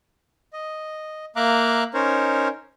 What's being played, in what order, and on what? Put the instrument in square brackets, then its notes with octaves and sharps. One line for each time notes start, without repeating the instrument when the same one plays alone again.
[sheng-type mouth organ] D#5
A#3 E5 F5 A#5 D6 F#6
C#4 D#4 A#4 C5 C#5